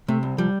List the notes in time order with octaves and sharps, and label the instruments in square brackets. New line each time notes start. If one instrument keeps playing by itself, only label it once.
[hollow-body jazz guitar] C3 [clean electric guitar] A3
[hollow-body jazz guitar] C2
[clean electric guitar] F3 [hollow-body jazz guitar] G3